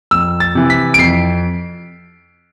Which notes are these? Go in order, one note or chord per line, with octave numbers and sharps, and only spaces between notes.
F2 E6
A6
C3 E3
B6
D7
F2 C7